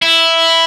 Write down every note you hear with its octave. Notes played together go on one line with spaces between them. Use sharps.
E4